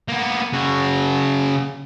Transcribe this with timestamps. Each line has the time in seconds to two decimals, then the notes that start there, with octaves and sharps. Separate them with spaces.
0.08 A#3 B3
0.53 C#3 F#4